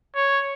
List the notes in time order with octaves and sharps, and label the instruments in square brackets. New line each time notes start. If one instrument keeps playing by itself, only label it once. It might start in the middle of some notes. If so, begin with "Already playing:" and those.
[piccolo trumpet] C#5